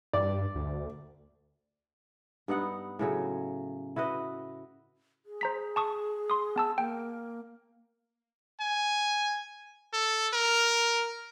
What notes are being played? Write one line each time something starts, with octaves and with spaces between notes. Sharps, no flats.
G2 D5
D2
G2 B3 D#4 F#5
A2 C#3 F#3
E4 F#4 B4 D#5
G#4
C5 A#5 B6
A5 C#6 D#6
C6 D#6
B3 A5 E6
A#3 G5
G#5
A4
A#4